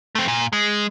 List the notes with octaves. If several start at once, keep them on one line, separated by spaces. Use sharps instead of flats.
A3 C4
A#2
G#3